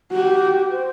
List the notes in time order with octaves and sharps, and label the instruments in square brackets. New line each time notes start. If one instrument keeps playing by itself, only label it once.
[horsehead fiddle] F#4 [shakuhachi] G4
[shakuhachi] C5